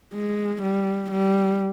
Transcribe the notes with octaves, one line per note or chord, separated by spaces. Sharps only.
G#3
G3
G3